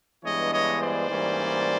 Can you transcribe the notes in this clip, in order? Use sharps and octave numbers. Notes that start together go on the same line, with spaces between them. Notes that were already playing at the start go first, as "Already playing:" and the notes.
G2 E3 G#3 B3 D4 C#5 D#5
C#5 D#5
C5 D5
G#2 E3 G3 A#3 C#4